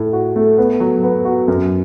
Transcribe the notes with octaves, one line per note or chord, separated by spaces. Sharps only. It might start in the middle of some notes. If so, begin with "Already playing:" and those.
Already playing: A2
F#4
A3
B3
F#3
B3
F#4
F#2